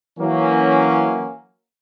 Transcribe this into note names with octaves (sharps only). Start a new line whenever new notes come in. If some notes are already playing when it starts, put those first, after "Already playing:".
E3 F#3 A#3 C#4